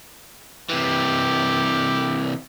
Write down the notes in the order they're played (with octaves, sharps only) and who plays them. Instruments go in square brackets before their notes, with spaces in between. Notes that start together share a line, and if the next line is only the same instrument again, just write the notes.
[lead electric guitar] C3 E3 [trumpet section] E4 G4